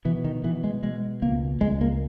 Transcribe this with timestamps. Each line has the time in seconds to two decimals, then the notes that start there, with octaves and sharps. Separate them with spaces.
0.05 B2 E3
0.24 D#3
0.44 B2 E3
0.64 G#3
0.83 B2 G#3
1.22 C#2 A#3
1.61 C#2 G#3
1.81 A#3